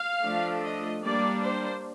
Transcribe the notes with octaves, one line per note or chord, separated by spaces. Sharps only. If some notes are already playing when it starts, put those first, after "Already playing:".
Already playing: F5
F3 A3 D4
D#5
G3 A#3 D4 D5
C5